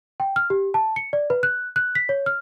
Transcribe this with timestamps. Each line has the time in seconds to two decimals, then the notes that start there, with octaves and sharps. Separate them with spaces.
0.20 G5
0.36 F6
0.50 G4
0.74 A5
0.96 C#7
1.13 D5
1.30 B4
1.43 F#6
1.76 F#6
1.95 B6
2.09 C#5
2.26 F6